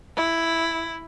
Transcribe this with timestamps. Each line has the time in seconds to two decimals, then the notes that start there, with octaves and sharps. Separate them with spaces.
0.16 E4